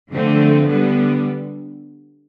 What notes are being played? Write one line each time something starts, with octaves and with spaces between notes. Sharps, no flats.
D3 F3 A3 C4
D3 G3 B3